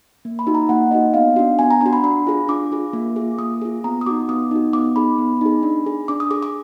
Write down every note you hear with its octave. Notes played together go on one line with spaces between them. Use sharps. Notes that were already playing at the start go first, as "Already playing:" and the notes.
A#3
B5
D#4 F#4
A#5
A#3 F#5
D#4 F#4 D#5
B3 F5
D4 F#4
B3 G#5
A#5
D4 F#4 A#5
B5
D4 B5
F4 G#4
D4 D6
F4 G#4
A#3
F4 G#4
A#3 D#6
F4 G#4
B3 A#5
D#6
D#4 F#4 D6
B3 D#6
D#4 F#4
B3 D6
D#4 G#4 B5
B3
D#4 G#4
D4
G#4
D4 D6
D#6
G#4 D6
D6